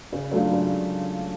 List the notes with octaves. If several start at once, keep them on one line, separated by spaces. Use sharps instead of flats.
C#3
F#3 A3 D4 F4
C#3